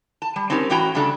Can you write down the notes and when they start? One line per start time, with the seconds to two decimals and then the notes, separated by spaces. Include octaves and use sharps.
0.22 A5
0.36 G3
0.50 C4 C#4 D#4 G4 A#4
0.70 A2 E3 C#4 F#4 G5 A#5
0.95 C#3 G3 A3 D4 A4